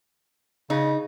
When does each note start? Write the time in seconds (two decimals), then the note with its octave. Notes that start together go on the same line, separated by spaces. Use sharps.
0.70 C#3 D#4